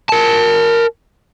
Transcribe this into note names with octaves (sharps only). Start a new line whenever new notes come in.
A#4 A5